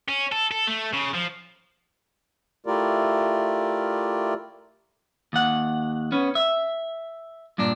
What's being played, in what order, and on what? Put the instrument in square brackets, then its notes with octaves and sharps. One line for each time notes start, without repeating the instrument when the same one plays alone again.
[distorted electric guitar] C#4
A4
A4
A3
C#3
F3
[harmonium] A3 E4 F4 G4 A#4 D5
[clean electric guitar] D#2 F#5
B3 C#4
E5
G2 A#2 D4